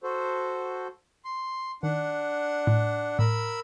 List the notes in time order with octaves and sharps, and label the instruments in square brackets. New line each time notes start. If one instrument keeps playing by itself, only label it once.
[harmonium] F#4 A4 C5
[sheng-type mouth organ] C6
[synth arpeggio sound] D#3 [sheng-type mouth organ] D4 F#5
[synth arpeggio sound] A2
[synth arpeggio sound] A2 [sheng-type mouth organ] A#4 B5 E6